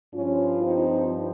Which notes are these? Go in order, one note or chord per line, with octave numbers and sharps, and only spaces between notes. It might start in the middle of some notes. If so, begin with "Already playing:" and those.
G2 F3 C#4 F4
C4 D#4